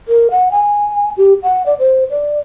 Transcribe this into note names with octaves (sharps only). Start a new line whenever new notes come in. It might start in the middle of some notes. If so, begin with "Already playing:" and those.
A#4
F#5
G#5
G4
F#5
D5
C5
D5